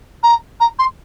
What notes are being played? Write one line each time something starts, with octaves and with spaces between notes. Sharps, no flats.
A#5
A#5
C6